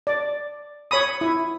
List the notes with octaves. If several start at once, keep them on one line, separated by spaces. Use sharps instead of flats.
D5
C#5 B5 D#6
E4